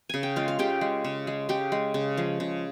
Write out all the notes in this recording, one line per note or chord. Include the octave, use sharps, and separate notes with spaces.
C#3 G#5
G5
G#3 F4 F5
F5
C#3 G4 G5
G#3
C#3
G#3
C#3 G4 G5
G#3
C#3
F3 G#3
C#3